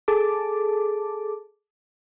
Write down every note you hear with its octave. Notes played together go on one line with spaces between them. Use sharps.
G#4 A4 A5 D6